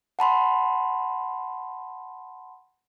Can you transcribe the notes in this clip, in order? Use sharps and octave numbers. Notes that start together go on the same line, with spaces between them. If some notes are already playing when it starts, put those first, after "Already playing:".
F#5 A5 B5 C6